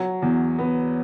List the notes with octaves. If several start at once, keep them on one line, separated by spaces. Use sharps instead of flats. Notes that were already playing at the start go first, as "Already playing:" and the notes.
Already playing: F#3
E2
B3